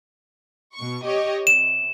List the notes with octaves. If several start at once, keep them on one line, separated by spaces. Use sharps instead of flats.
B2 C#6
G4 C#5 D#5
C3 E7